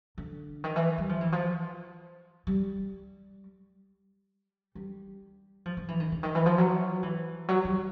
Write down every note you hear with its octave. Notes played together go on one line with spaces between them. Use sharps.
D3
D#3
E3
G3
F3
E3
F3
G3
G3
F3
F3
E3
D#3
D3
D#3
E3
F3
F#3
E3
F#3
G3